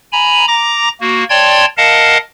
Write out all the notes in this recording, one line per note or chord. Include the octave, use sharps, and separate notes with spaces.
G#5 A#5 B5
A#5 D6 A#6
A#3 F#4
C#5 D5 G5 A5 C6 G#6
A#4 D#5 F5 F#5 A5